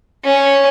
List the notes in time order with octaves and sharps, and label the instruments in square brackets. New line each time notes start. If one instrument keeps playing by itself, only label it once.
[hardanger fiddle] C#4